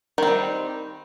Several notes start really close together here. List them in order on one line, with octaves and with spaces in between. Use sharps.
D#3 C4 G3